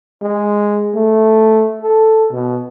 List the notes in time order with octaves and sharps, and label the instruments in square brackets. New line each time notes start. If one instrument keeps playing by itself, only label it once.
[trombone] G#3
A3
A4
B2